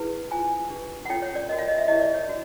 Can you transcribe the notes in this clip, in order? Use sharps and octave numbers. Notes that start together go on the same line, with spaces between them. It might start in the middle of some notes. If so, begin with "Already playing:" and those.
Already playing: E4 G#4 B4
F4 G#4 C5 G#5
D4 G4 B4
F#5
C#4 F4 A4 C#5 G5
C#5
D5
F#4 A#4 C#5 D#5
F5
D#5
E5
E4 G4 A#4 C#5 D#5
D5
C#5
D4 F#4